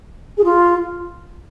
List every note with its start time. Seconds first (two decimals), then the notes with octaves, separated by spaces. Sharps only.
0.37 G#4
0.44 F4